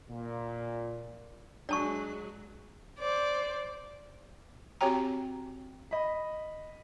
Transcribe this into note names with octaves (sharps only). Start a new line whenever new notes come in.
A#2
F#3 G#3 D4 D5 G#5 A5 C#6
C5 D5
C4 F#4 G4 C#5 G5 A#5
D#5 B5